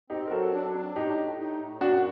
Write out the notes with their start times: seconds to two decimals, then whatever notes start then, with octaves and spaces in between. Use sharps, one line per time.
0.10 C4 D#4 G4
0.27 A#4
0.31 F#3 F#4 A4
0.52 D4
0.74 D4
0.95 A2 D#4 G4
1.16 A2
1.38 D#4
1.60 A2
1.81 F#2 D4 F#4